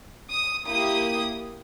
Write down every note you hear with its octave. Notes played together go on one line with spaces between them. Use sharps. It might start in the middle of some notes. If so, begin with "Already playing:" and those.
D#6
A#3 E4 G4 D#6